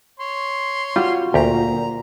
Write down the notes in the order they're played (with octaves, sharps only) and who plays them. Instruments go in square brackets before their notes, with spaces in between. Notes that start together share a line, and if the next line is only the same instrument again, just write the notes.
[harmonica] C#5 C6
[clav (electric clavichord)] G3 [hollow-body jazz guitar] F4 F#4
[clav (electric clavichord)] D2 G4 [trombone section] A#2 [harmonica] A#5